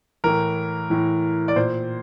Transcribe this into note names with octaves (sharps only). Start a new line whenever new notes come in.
A2 E3 A#4
A2 E3
D5
A#2 C5